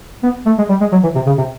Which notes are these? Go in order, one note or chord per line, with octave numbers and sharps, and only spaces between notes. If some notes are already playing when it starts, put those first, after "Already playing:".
B3
A3
G#3
G3
G#3
F#3
E3
C3
C#3
C3